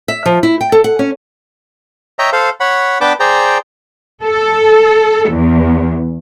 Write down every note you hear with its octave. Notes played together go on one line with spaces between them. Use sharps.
E5
F3
E4
G5
A4
F#5
C#4
C#5 D#5 E5 G5 A#5
A4 C5 F5
C#5 F#5 B5
B3 D4 B4 G5 A5 D6
G#4 C5 D5 G5 A#5
A4
E2